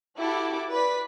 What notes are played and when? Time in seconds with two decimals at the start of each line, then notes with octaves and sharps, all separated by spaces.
0.17 E4 F#4 G4 A4 D6
0.70 B4 D5 B6